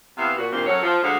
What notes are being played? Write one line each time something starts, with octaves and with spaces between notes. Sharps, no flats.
C3 E3 B3 E5 F5
A#2 F#4
G2 A#2 D#3 A#3 C4 F5
F#2 F#3 C#4 A4 C#5
F3
D2 D3 G#3 F#4 D#5 F5